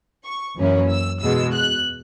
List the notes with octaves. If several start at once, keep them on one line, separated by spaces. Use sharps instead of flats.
C#6
F#2 E3 A#3 C#4 E4
E6
E2 B2 G#3 E6
F#6